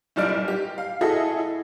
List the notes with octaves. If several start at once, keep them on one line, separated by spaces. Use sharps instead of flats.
F#1 B1 G3 D5 F6 D7
B1
G4
F5
E4 F#4 G#4 A4 D#5 E5
E4